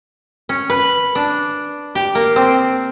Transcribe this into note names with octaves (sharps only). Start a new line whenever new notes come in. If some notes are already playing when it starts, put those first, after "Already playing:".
C#4
B4
D4
G4
A#3
C4